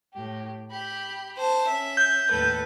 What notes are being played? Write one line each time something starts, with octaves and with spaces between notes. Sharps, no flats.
A2 G4
G4 B5
C5 A5
C#4 E5
G6
D#2 A2 A4 B4